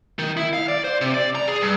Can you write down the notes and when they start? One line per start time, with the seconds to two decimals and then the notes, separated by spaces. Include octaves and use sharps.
0.19 D#3
0.37 E4
0.53 F5
0.68 D5
0.84 C5
1.01 C3
1.14 D5
1.35 A#5
1.48 G#4
1.61 G2